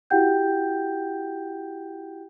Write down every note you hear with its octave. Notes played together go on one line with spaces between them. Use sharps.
E4 F#4 G4 F#5 G5 G6